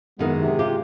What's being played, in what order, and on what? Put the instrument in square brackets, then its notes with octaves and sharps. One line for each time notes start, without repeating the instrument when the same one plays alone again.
[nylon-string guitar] F#2 D#3 E3 [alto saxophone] G#3 [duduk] B3
[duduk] C3
[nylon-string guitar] F4 G4